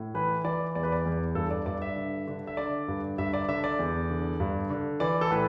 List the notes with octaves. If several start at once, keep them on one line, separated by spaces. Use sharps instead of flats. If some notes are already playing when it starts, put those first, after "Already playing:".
Already playing: A2
E3 B4
E3 D5
E2 D5
B4
D5
E2
G2 A4
D5
G2 D5
E5
D3
D3
E5
D3 D5
G2
G2 E5
D5
D3 E5
D5
E2
D3
G2
D3
E3 D5
A4
A2 B4